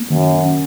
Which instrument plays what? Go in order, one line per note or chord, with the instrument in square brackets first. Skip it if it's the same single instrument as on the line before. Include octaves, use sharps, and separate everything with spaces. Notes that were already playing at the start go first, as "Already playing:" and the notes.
Already playing: [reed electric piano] A#3
[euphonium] F#2 [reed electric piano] D#3
[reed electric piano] C#4